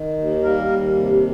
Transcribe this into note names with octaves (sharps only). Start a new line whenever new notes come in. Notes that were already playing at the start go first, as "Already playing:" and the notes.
Already playing: D#3
D#2
G3 A#3 A#4
D#2
C3